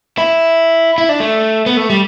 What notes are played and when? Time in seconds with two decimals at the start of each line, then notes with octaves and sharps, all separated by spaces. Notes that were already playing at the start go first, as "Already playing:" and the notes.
0.18 E4
0.98 E4
1.09 D4
1.20 A3
1.66 B3
1.77 A3
1.90 G3